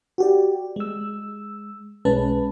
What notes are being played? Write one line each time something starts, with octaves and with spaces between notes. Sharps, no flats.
F#4 G4 D5
G#3 E6
B1 G#3 C#4 B4 A5